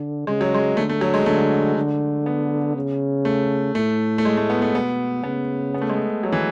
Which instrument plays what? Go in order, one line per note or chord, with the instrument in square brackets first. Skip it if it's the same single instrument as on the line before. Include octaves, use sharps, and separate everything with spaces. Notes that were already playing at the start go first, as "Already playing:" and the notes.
Already playing: [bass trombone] D3
[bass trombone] C#3 [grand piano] G#3
[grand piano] F#3
G#3
[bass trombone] D3 [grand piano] A3
[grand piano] A3
F#3
G#3
[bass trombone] D3 [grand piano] A3
[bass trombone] D3
[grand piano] B3
[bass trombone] C#3
[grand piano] A3
[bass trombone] A2 [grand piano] A3
[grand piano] A3
G#3
A3
B3
A3
[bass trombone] B2 [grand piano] B3
[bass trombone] C#3 [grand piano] B3
[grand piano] B3
A3
G#3
A3
F#3
E3